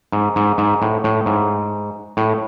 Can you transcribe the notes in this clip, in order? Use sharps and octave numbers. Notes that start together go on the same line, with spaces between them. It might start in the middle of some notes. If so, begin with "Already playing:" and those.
G#2
G#2
G#2
A2
A2
G#2
A2